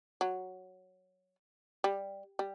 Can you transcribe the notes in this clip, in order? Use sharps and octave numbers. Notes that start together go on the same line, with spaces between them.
F#3
G3
G3